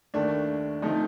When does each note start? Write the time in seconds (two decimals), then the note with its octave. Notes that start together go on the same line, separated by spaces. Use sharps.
0.14 D#2 D#3 A3 D4
0.82 C3 F3 A3 D#4